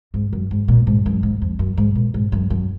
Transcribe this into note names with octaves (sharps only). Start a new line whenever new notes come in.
G#2
F#2
G#2
A#2
G#2
F#2
G#2
F2
F#2
G#2
A#2
G#2
F#2
F#2